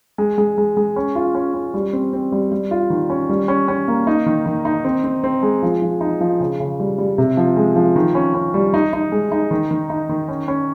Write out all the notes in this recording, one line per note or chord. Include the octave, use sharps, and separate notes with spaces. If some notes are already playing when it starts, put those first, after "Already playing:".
G#3
G#3
G#3
G#3
C#4
F4
C#4
C#4
G3
C4
C4
G3
G3
F4
D#3
C#4
G3
C#4
C#4
A#3
D#4
D#3
D#3
D#4
C4
C4
C4
G#3
F3
F3
D#4
F3
C#3
C#3
G3
G3
C3
F3
G#3
F3
D#3
C#4
C#4
G3
D#4
D#4
G#3
D#4
D#3
D#3
D#4
D#3
C#4
C#4